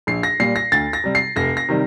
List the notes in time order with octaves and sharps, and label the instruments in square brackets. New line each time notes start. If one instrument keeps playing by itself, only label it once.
[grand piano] A#1 C7
A#6
A#2 G3 C7
A#6
D2 A6
A#6
C3 G3
C7
F1 A#6
A#6
C3 D#3 G3